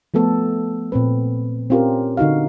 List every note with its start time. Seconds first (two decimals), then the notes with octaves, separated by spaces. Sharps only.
0.14 F3 A3 B3 A4
0.92 A#2 C4 B4
1.70 C4 C#4 F4 G4 A#4
2.17 D3 D#4 F#4 F5